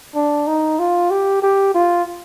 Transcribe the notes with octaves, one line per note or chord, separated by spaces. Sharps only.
D4
D#4
F4
G4
G4
F4